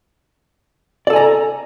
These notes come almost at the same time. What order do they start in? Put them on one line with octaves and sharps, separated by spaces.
D5 A4 G#5 A#5